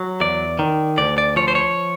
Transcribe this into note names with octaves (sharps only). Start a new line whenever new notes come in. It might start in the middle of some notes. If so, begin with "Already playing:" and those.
Already playing: F#3
E2 D5
D#3
D2 D5
D5
F3 C#5
C5
C#5